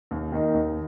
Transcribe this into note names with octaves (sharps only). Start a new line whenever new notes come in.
D#2
D#3 A#3 D#4
D#2